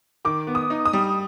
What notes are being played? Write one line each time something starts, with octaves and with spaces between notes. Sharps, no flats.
D#3 D6
B3
D#6
D#4
D#6
G3